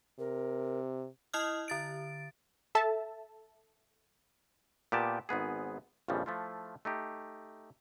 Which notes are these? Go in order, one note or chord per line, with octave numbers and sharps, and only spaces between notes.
C3 A#4
E4 D#5 D#6 F6
D3 A6 D7
A4 E5 A5
A#2 B3 G4 G5 A5
G#1 G#2 B3 G#4
A#1 F2 C#3 E3 F3 G3
F3 A3 E4 F4
A3 D#4 G4